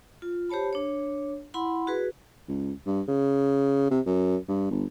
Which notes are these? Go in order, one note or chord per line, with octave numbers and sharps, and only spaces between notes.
F4
G4 C5 C#5 A5 B5
D4 C#5
E4 F#5 B5 C6
F#4 G#4 B4
C#2
G2
C#3
C3
F#2
G2
G1